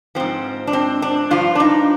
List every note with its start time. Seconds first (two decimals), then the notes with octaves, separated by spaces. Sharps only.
0.15 G#2 F3 C4
0.67 D4
0.73 C4
1.02 D4
1.31 G2 F3 F4
1.55 D4
1.60 D#4